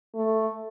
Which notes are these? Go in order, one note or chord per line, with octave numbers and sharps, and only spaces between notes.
A3